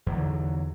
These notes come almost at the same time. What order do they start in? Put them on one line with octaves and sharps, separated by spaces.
E2 D3 F#3